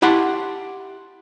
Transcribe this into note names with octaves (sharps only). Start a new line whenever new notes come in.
E4 G4 F#5 A5 C6